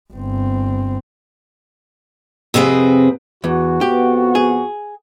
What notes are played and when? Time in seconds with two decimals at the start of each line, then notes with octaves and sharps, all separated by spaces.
0.13 G1 C4
2.54 F2 C3 C4 G#4 B4
3.44 E2 F#4
3.81 F2 B3 G4
4.35 G#4